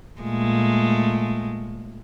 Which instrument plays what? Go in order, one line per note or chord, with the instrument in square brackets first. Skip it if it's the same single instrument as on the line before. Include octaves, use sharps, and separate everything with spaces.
[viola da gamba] A#2 G#3 A3